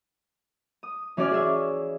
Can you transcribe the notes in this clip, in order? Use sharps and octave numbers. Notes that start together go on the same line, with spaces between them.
D#6
E3 C#4 F#4 D5 G#5 F6
G#4 E5